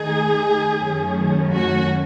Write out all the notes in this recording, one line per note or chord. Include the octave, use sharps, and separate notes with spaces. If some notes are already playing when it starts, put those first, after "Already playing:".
Already playing: D#3 A3 D#4 G#4
F#2 D#3 A3 C#4
F#4